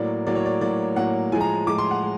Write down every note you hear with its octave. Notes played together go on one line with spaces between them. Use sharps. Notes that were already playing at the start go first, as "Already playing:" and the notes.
Already playing: A2 F#3 A#3 D5
A2 F#3 A#3 D5
C#5
D5
A2 F#3 A#3 D5
A2 F#3 A#3 F#5
A2 F3 G#3 G#5
A#5
A2 F3 G#3 D6
C6
F#5
G#3